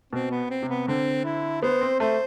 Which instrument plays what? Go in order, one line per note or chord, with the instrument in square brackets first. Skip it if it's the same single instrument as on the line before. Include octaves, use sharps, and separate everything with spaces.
[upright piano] B2 [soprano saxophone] C4
[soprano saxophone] B3
C4
[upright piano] C3
[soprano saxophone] B3
[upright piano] D3 [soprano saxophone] C4
[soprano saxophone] E4
[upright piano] B3 [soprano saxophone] C5
[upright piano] C4
[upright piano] A3 [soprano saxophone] C5